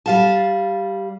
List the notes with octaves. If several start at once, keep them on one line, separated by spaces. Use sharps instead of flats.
G3 F5 A5